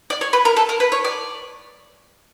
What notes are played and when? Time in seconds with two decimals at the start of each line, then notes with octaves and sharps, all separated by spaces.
0.10 D5
0.21 C#5
0.33 B4
0.45 A#4
0.57 A4
0.69 A#4
0.80 B4
0.92 C#5
1.05 D5